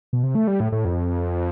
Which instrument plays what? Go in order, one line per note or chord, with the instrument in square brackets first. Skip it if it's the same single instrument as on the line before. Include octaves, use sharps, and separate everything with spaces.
[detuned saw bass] B2
C3
A3
G3
A2
A2
F2